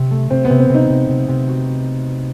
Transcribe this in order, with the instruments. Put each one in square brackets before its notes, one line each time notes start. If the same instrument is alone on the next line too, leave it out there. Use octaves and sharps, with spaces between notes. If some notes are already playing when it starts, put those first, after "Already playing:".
Already playing: [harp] C3
A3
[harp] C3 [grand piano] C4
[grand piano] B3
[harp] C3
[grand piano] C4
[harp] C3
[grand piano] D#4
[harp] C3
C3
C3
F#4
F#4